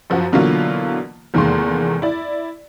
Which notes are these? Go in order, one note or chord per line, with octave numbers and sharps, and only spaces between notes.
F#2 F3 F#4
B2 D3 E3 F#3 A#3 F4
F1 E2 D#3 G#3 A#3 C6
E4 D5